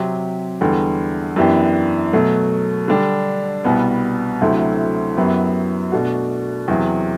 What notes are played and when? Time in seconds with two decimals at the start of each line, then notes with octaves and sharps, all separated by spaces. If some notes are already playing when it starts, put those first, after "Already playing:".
Already playing: C3 F#3 C4 G4
0.61 E2 D3 G3
1.36 F#2 E3 B3 D4 G4
2.13 B2 F#3 A3
2.88 D3 G3 D4
3.64 C2 B2 G3 B3
4.41 D2 C3 F#3 A3 E4
5.17 F#2 F#3 B3 E4 G4
5.92 B2 A3 D4 F#4
6.68 E2 C3 F#3